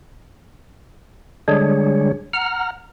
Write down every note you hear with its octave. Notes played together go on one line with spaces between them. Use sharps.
D3 G3 G#3 D4 G#4 C#5
F#5 A#5 F6